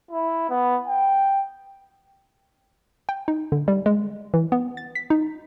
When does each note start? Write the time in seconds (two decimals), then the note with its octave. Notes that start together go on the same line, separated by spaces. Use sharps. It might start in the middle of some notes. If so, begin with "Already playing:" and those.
0.11 E4
0.50 B3
0.87 G5
3.09 G5
3.28 D#4
3.52 D3
3.68 G3
3.86 G#3
4.34 E3
4.52 B3
4.77 A6
4.95 B6
5.10 D#4